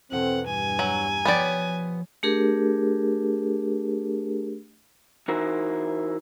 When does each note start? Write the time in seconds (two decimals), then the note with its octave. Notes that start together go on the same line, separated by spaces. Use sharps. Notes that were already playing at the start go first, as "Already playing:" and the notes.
0.12 E2 B2 C4 A4 F#5
0.47 G2 G#5
0.79 F#3 A#5 E6 G6
1.25 F3 B3 G4 C#5 D5
2.23 A3 D4 G4 G#4 A#4
5.28 E3 D#4 E4 F#4 A#4 C5